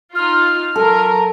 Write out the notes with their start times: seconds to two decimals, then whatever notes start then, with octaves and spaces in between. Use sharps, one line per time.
0.15 D#4 F4 F6
0.75 F#3 F4 A4 A#4